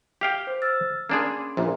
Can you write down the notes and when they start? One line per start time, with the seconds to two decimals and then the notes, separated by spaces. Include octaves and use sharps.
0.21 G4 F5 G5
0.47 C5
0.62 E6 F6 A6
1.09 A#3 C#4 D4 G#4 B5 C6
1.57 A#1 A#2